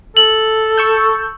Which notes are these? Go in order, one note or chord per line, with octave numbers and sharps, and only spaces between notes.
A4 F#7
C#6 E6 G6